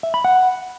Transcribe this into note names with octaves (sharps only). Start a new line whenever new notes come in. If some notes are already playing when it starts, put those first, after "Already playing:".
E5
B5
F#5